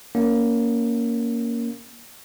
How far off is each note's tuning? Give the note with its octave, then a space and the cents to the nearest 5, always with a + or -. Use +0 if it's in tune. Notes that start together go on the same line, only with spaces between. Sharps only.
A#3 +0 C#4 +25